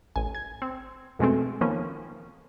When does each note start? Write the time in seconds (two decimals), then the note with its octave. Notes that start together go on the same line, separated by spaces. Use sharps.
0.16 A1 G#5
0.35 G#6
0.62 C4
1.19 F2 B2 G#3 A3 C4
1.61 D#3 F3 A#3 B3 C#4